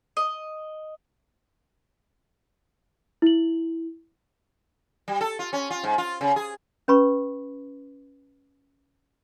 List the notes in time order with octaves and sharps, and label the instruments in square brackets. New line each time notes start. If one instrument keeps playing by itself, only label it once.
[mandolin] D#5
[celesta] E4 F#7
[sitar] G3
A4
F4
C#4
F4
G#2
F4
C#3
G#4
[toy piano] C#4 B4 B5 C#6